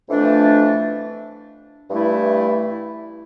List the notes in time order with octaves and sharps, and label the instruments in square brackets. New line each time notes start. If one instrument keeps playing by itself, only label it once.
[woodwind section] F2 E3 A3 D4
G2 E3 A3 E4